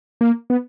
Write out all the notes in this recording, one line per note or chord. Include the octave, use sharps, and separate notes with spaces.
A#3
B3